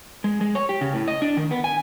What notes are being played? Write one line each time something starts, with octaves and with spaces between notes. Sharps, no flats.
G#3
G#3
C#5
G4
C#3
A2
D#5
D4
D#3
B3
G#5